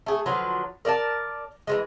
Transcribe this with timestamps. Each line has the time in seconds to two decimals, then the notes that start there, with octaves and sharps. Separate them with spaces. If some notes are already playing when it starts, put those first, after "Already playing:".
0.06 A3 G#4
0.26 D3 F3 F#3 B4
0.85 A#4 D5 E5 A5
1.67 E3 F3 G#3